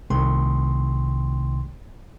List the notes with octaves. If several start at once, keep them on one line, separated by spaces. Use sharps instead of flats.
C2 C3 D#3 A3 G5 C6